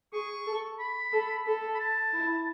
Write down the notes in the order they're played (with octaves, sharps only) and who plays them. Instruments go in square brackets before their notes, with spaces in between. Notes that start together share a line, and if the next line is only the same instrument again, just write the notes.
[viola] G#4 [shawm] C#6
[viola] A4
[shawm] B5
[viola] A4
A4
[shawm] B5
A5
[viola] E4